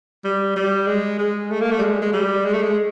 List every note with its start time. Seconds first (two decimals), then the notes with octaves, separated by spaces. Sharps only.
0.24 G3
0.56 G3
0.87 G#3
1.18 G#3
1.51 A3
1.61 A#3
1.71 A3
1.78 G3
1.81 G#3
2.02 G#3
2.13 G3
2.45 G#3
2.54 A3
2.63 G#3